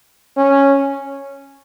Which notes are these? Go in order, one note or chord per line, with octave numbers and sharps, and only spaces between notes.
C#4